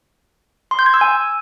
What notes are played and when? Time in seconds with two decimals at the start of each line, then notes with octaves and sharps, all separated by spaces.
0.71 C6
0.79 G6
0.86 G#6
0.94 E6
1.01 G#5